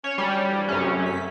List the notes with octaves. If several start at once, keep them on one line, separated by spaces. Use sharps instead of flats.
C#4 C#5
D2 G3 C#4
G2 E3 F3
F#2 C3 A3 C#4
B6